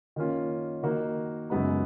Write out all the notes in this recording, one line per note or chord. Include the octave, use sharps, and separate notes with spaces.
D#3 A#3 C#4 F4
D#3 A#3 D#4 F#4
F#2 C#3 G#3 B3 D#4